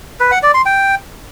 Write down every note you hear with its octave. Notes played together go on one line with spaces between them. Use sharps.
B4
F#5
D5
C6
G5